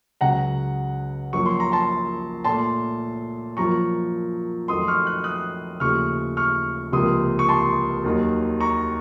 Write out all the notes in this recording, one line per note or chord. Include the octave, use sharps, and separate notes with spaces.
C#2 C#3 F#3 F#5 A#5
F#2 F3 A#3 C#6
C6
A#5
A5 C6
A#2 A3 A5 C6
F#2 F3 A#3 A#5 C#6
F2 D#3 F#3 A3 C6 D#6
C#6 F6
F#6
D#6 F#6
D#2 C#3 F3 A3 C#6 F6
C#6 F6
C#2 C3 F3 A#3 C6 D#6
C#6
A5 C6
D#2 D#3 F#3
A#5 C#6